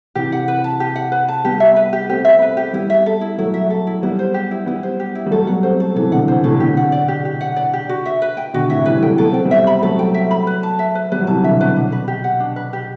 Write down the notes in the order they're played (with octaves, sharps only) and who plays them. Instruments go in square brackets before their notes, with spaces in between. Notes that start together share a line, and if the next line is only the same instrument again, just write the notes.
[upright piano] C3 E3 [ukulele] G4
[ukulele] F#5
B4
A5
G4
F#5
B4
A5
[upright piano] G3 B3 [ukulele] G4
[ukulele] E5
B4
G4
[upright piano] A3 C4 [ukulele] G4
[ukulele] E5
B4
G4
[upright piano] G3 B3 [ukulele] E4
[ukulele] E5
A4
E4
[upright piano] F#3 A3 [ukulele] E4
[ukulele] E5
A4
E4
[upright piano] G3 B3 [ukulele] E4
[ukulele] C5
G4
E4
[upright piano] G3 B3 [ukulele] E4
[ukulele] C5
G4
E4
[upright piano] G3
[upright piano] F#3 A3 [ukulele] A4
[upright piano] G3 B3 [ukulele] F#5
[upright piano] A3 C4 [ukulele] C5
[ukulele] A4
[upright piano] C3 E3 [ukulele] A4
[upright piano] B2 D3 [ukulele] F#5
[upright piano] C3 E3 [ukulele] C5
[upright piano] A2 C3 [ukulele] A4
[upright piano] B2 D3 [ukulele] G4
[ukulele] F#5
D5
G4
G4
F#5
D5
G4
F#4
E5
B4
G5
[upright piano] B2 D3 [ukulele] F#4
[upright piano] A2 C3 [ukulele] E5
[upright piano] E3 G3 [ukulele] B4
[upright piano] F#3 A3 [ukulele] G5
[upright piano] B3 [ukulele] A4
[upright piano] C4 [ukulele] G5
[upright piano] G3 B3
[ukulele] E5
B5
[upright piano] F#3 A3 [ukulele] A4
[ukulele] G5
E5
B5
B4
A5
E5
B4
[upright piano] G3 B3 [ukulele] B4
[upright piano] F#3
[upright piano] C3 E3 [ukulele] A5
[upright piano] B2 D3 [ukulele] E5
[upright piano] B2 [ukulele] B4
[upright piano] B2 [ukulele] D4
[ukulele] B4
G4
F#5
D4
B4
G4